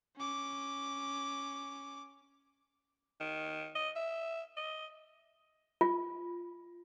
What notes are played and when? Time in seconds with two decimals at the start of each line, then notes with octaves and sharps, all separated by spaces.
0.17 C#4 D6
3.20 D#3
3.75 D#5
3.96 E5
4.57 D#5
5.81 F4